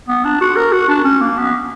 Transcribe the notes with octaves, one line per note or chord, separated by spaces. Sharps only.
B3
D4
F#4
A#4
F#4
D4
C#4
A#3
B3